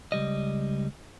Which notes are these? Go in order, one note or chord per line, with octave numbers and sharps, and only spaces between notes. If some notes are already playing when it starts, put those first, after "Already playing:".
C#2 G3 D#5